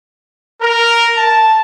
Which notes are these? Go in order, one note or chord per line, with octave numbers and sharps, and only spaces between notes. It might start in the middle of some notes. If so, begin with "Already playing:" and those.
A#4
A5